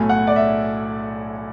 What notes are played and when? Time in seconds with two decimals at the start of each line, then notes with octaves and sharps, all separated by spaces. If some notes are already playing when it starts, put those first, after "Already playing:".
Already playing: B1 A2 F#3 A3 G#5
0.09 F#5
0.27 D5
0.36 E5